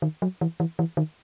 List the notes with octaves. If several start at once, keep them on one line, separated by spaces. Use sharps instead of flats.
D#3
F#3
E3
E3
E3
D#3